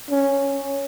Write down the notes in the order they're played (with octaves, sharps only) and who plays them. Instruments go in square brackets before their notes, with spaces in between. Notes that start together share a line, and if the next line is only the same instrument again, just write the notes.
[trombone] C#4